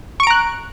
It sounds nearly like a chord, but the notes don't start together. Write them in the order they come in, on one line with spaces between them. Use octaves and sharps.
C#6 D7 A#5 F#6